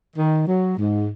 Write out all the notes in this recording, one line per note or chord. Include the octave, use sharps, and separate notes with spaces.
D#3
F#3
G#2